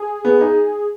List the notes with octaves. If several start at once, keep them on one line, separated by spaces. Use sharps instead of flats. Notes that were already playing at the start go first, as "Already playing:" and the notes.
Already playing: G#4
B3
D#4